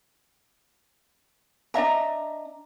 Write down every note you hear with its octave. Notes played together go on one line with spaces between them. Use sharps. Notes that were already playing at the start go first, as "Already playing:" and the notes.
D4 D#5 E5 A#5